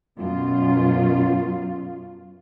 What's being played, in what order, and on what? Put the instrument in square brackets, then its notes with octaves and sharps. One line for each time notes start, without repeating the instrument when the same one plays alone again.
[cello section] F#2 B2 F4